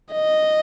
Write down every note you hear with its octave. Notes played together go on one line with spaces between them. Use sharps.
D#5